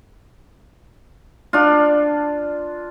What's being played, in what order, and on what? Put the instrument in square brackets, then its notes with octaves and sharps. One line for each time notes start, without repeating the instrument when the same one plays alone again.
[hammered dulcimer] D4 F4